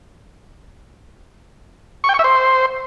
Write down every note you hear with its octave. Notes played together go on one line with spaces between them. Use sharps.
C#6
G5
C#6
E5
C5